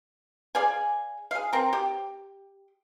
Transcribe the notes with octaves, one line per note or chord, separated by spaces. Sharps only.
G#4 D5 F5 G#5
G#4 F5
C4 A#4
G4